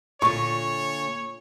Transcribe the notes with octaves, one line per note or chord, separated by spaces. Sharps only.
A#2 D3 C#5 C#6